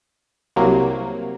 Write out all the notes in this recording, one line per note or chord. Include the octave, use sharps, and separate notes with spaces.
C2 C3 F#3 A#3